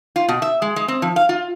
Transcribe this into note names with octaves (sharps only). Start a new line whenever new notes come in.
F4
B2
E5
G#3
G#3
C4
F3
F5
F4